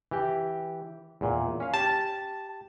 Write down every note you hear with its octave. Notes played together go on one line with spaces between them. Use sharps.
E3 G4
E2 A#2
C#4 F5
G4 A5